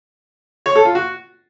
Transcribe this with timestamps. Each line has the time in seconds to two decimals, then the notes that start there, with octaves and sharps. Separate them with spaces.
0.66 C#5
0.75 A4
0.85 F4
0.95 F#4